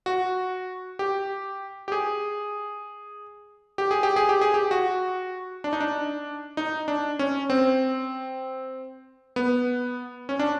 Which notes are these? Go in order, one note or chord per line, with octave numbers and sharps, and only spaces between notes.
F#4
G4
G4
G#4
G4
G#4
G4
G#4
G4
G#4
G4
F#4
D4
D#4
D4
D#4
D4
C#4
C4
B3
C#4
D4